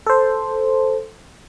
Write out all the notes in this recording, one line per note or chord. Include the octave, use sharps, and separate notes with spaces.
A4 C5